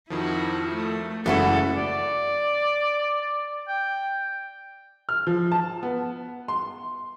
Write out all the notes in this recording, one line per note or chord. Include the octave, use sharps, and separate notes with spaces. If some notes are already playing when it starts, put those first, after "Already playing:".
F2 D#3 F3 E4 F#4
A3
F#1 E3 G#3 B3 E4 F#4 A4
D5
G5
F6
F3
A5
B3
C6